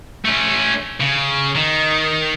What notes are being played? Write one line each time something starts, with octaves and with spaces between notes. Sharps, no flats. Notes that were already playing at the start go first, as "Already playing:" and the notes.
A3 C#4
C#3
D#3